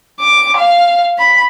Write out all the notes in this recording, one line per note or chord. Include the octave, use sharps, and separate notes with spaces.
D6
F5
B5